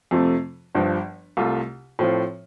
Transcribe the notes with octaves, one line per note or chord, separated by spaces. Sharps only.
F2 C3 F3 A3
G1 G2 F3
C2 C3 A3 F4
A2 F3 C4 F4